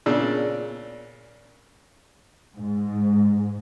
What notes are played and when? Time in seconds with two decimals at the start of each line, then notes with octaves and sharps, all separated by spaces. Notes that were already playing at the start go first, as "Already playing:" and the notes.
0.06 A#2 C#3 D4 E6
2.55 G#2